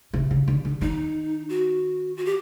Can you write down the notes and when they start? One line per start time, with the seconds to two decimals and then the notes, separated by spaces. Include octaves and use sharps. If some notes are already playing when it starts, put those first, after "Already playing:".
0.14 C3
0.31 C#3
0.48 D3
0.65 D3
0.81 D#3 D#4
1.49 F#4
2.17 F#4
2.26 G4